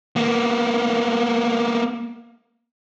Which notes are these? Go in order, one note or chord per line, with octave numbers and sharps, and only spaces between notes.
A#3 B3